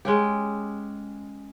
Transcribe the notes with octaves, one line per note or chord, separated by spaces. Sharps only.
G#3 C#4 G4